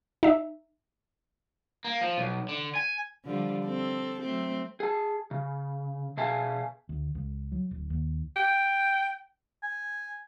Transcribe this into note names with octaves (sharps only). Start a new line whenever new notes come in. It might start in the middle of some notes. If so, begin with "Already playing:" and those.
D#4 E5
A#3
F3
B1
D3
G#5
D3 F3 G3
C4 A4
F#3 A3 C4
G#4 A5
C#3
B2 G#4 E5 F5 G#5 A5
D2
C#2
F#3
D1
D#2
G5
G#5